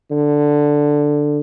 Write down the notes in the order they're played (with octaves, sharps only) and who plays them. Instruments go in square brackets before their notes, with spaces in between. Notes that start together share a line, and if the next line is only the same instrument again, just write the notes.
[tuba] D3